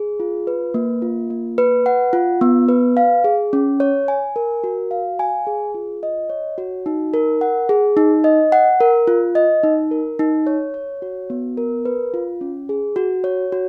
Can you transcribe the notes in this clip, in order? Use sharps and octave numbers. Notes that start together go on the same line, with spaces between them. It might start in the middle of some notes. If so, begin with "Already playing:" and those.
Already playing: G#4
F4
B4
A#3
F4
A#3
B4
F#5
F4
B3
B4
F5
G#4
C#4
C#5
G#5
A#4
F#4
F5
G#5
G#4
F4
D#5
C#5
F#4
D#4
A#4
F#5
G#4
D#4
D#5
F#5
A#4
F4
D#5
D#4
A#4
D#4
C#5
C#5
F#4
B3
A#4
B4
F4
C#4
G#4
F#4
C#5
F#4